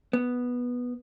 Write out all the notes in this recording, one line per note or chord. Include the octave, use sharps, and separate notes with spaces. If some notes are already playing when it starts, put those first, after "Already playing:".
B3